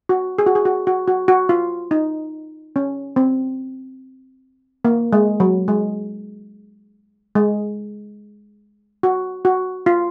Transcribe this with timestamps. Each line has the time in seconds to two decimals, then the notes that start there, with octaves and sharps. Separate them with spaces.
0.09 F#4
0.39 G#4
0.47 F#4
0.55 G#4
0.65 F#4
0.87 F#4
1.08 F#4
1.28 F#4
1.49 F4
1.91 D#4
2.76 C#4
3.16 C4
4.85 A#3
5.13 G#3
5.40 F#3
5.68 G#3
7.35 G#3
9.03 F#4
9.45 F#4
9.86 F4